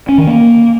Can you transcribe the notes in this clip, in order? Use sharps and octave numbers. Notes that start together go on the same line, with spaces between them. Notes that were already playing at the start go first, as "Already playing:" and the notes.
C#4
D#3
A#3